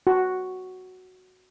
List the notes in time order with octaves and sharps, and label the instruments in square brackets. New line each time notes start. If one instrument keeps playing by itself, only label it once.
[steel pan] F#4